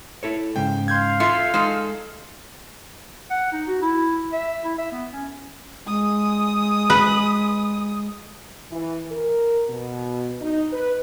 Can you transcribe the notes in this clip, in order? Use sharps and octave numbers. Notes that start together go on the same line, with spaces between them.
E4 A4 C#5
G#2 C#3 G5
F5 C6 G6 G#6
F4 A4 E5 C7 C#7
G#3 D#4 A4
F#5
D#4
F#4
E4
E5
E4
E5
B3
C#4
G#3 D#6
B4
E3
A#4
B2
D#4
B4